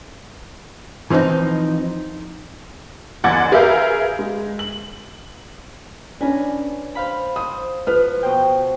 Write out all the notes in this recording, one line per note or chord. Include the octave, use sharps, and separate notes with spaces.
E3 F3 C4 D4 D#4
F#1 E2 F#5 D6 G#6 A6
G#4 A#4 B4 E5 F5 G6
G#3
F#7
C#4 D4 B4 G#5 A#5
C5 F5 B5
C5 D#6
F3 F4 B4 F6
B2 C5 G5